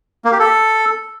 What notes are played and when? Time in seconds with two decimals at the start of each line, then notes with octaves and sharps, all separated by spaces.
0.25 A#3
0.32 G4
0.39 A4